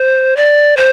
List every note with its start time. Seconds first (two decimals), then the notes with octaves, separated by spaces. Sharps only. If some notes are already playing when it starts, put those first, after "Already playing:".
Already playing: C5
0.36 D5
0.77 C5